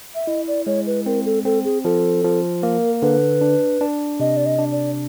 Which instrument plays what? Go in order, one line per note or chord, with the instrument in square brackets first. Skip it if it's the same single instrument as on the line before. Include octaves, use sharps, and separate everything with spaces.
[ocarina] E5
[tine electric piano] E4 [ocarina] D#5
[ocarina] D5
[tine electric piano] G#3 [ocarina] C#5
[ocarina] B4
[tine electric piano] C4 [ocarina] A#4
[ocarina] A4
[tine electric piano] C4 [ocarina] A4
[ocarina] G#4
[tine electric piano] F3 [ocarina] A4
[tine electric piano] F3
[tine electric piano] A#3 [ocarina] A#4
[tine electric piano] D3 [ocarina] B4
[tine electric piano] D4
D4
[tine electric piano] C3 [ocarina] D#5
[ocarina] D5
D#5
[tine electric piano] D4
[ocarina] D5